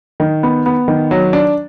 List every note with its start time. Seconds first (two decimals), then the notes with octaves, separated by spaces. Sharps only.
0.20 D#3
0.43 B3
0.66 B3
0.88 D#3
1.11 F#3
1.33 D4